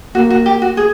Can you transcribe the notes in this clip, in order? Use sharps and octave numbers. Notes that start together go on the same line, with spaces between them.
A#3 F#4
F#4
G4
F#4
G#4